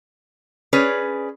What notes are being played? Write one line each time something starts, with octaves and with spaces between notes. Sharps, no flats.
C#4 G#4 B4 C#5 D5